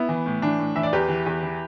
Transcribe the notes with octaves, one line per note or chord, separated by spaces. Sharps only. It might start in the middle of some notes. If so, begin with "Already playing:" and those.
Already playing: B3 E4
E3
A2
E3 D4
A2
E3 E5
D5
E2 G4 B4
E3
E2
E3